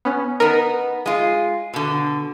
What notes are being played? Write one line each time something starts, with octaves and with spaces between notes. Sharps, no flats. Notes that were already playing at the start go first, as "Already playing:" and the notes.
B3 C#4
B3 D#4 A#4
G#3 F4
B2 D3